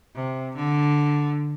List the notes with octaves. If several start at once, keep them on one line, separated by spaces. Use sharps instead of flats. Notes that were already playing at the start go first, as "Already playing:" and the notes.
C3
D3